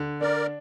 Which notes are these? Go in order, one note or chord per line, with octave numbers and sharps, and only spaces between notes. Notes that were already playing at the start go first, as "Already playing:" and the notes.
Already playing: D3
D4 A#4 D5